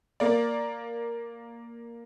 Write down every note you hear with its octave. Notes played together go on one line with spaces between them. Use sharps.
A#3 D5